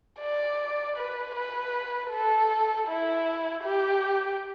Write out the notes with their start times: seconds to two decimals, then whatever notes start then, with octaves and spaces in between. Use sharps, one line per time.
0.20 D5
0.97 B4
1.35 B4
2.11 A4
2.88 E4
3.64 G4